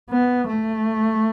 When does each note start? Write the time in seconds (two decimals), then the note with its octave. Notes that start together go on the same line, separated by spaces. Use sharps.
0.10 B3
0.48 A3